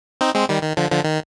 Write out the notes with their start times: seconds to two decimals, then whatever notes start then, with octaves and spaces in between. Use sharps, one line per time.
0.21 C4 D#4
0.35 G#3 C4
0.49 D#3 G3
0.63 D#3
0.77 D3 F3
0.91 D3 F3
1.04 D#3